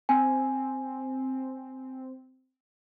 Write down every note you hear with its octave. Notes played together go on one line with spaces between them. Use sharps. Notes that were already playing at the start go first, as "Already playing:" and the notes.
C4 G#5